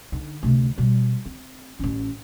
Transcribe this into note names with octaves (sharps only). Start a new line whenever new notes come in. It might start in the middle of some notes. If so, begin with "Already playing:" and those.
D3 D#4
D2 C3
B2 G3
C4
A1 C#4